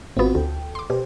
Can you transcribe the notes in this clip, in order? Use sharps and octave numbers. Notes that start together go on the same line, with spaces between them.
G#1 B3 C4 F4 F#4
D2 A4 G5
C6 D6
B2 G4 C5